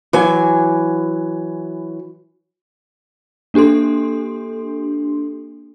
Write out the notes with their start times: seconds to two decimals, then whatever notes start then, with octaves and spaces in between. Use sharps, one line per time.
0.13 E3 F#3 G#5
3.54 A#3 D4 G4 A4 C6